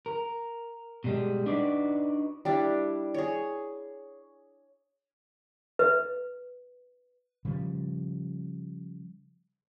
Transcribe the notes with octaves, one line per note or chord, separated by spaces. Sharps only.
A#4
B2 G3 G#3
D4 D#4 F#4 B4 D5
G3 D4 E4
G#4 C#5
B4
C#3 F3 G3